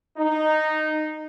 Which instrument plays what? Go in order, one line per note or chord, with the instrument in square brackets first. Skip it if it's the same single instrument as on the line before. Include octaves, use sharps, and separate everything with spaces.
[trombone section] D#4